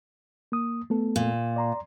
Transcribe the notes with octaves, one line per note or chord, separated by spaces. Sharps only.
A#3 D#6
A3 B3 A4
A#2
D5 A#5 C6